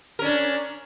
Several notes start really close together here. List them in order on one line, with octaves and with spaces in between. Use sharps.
A#4 C#4 D4